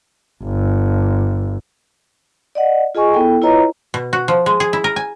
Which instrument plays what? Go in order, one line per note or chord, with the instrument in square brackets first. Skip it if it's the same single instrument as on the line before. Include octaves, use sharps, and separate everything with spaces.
[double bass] G1
[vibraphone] D5 D#5 F#5
F4 G#4 D#5 G#5 C#6
B3 E4 A4 G5
E4 F4 B4 C#5 D#5 A#5
[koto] B2
F#4
F3
G#3
G#4
E4
A#4
G#5